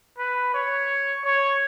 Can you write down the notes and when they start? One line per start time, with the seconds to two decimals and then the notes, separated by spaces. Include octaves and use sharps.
0.18 B4
0.54 C#5
1.25 C#5